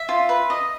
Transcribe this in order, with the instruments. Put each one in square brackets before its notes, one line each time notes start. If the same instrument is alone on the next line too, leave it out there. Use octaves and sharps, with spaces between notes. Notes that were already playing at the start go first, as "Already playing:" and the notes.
Already playing: [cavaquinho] E5
F4
B4
D#5